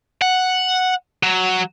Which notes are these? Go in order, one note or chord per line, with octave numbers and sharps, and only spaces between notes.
F#5
F#3